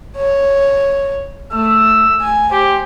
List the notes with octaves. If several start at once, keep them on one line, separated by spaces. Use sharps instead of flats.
C#5
A3 E6
G#5
G4 C5